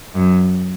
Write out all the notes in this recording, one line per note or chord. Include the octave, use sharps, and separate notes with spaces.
F#2